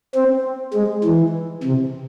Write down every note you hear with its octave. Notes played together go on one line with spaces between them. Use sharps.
C4
G#3
E3
C3